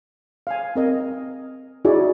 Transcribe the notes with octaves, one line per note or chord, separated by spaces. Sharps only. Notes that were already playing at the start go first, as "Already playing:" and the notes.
F5 G#5
C4 A#4 D#5
D#4 E4 F#4 G#4 D5